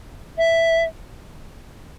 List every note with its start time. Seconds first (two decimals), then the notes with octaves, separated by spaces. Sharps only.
0.38 E5